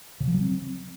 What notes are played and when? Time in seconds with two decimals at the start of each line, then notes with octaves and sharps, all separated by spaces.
0.20 C#3
0.27 F3
0.34 F#3
0.41 C4